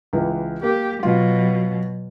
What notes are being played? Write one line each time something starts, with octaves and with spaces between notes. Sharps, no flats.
C#2 E3
A#3 G4
B2 F#3 F4